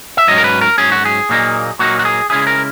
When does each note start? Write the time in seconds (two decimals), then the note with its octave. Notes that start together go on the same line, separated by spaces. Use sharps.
0.17 E5
0.28 G#2 F#3 C#4 D#5
0.38 A#4
0.44 B4
0.61 A#4
0.78 G#2 F#3 C#4 G#4
0.92 F#4
1.05 G#4
1.29 A#2 F#3 A#3 D#4
1.79 A#2 F#3 A#3 D#4 F#4
1.99 F#4
2.05 G#4
2.30 C#3 G#3 C#4 E4 G#4
2.47 A#4